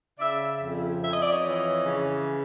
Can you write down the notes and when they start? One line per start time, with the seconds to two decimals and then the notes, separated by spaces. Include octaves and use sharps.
0.19 C#3 D5 E5
0.61 F2
1.02 F2 E5
1.12 D#5
1.21 D5
1.31 C#5 D#5
1.43 E3
1.84 C#3